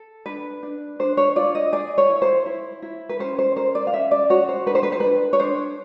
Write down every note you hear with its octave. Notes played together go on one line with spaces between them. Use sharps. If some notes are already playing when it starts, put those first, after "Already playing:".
Already playing: A4
D4 B4
D4
D4 C5
C#5
F4 D5
D#5
G#4 D5
C#5
E4
C5
E4
E4
B4
C#4 C5
C5
A#4 C5
D5
F5
C#4 E5
D5
F#4 C#5
C5
D4 B4
C5
B4
C5
D4 B4
C#5
D4 C5